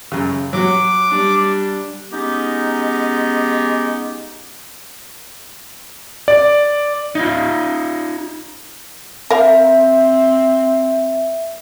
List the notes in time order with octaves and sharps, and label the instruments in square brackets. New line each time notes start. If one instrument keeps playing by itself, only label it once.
[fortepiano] F#2 C#3
[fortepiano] F#3 F#4 [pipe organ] D6
[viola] G3 D4
[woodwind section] G#3 B3 C#4 D#4 G4
[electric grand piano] D5
[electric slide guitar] D#4 F4
[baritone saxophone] C4 [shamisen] A#4 F5 [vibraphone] E5